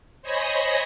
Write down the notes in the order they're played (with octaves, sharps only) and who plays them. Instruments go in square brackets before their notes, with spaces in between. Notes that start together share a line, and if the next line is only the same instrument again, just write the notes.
[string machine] C5 C#5 D#5 G#5 B5 A#6